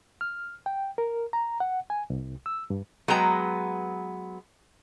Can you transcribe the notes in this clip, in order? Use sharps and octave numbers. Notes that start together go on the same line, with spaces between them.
F6
G5
A#4
A#5
F#5
G#5
C2
E6
G2
F#3 G#3 B3 B4 G5 A#5